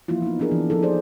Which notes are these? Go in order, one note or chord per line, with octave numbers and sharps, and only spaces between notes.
E3 F3 A#3 E4 F4
B3 D#4
B3 C#4 D4 G#4 A#4
E3
E3 F3 D#4 A4
D#4 G#4 A#4 C5 D5